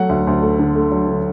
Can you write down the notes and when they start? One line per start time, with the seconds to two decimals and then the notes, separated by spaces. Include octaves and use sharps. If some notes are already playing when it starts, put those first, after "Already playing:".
Already playing: F#3 A3 F#5
0.09 D2
0.27 D2
0.42 A3
0.59 D3
0.75 A3
0.92 F#3
1.08 D3